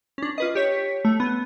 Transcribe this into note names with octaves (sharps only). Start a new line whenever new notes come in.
C#4 D4
F4 B4 D#5
G4 C#5 B6
A3
B3